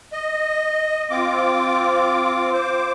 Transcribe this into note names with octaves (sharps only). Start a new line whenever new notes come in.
D#5
C4 F4 D6
C5 D6